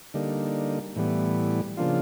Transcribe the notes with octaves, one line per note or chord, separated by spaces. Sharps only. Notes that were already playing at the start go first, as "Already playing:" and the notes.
D3 G3 A#3 D#4
A2 E3 G3 B3
C#3 F3 A#3 D4 F4